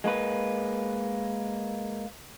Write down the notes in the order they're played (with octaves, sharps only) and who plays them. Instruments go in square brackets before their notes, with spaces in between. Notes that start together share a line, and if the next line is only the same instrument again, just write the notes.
[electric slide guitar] G#3 A#3 D#4 B4